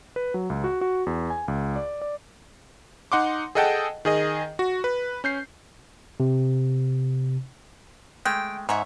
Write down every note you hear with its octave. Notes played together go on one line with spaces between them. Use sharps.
B4
F#3
C#2
F#4
F#4
E2
G#5
C#2
D5
D5
D#4 F#5 C6 D6
G#4 A4 D#5 F#5 G5 A5
D#3 G#4 D#5
F#4
B4
C#4 G6 C7
C3
G#3 A3 G5
G#2 C#5 E5 F#5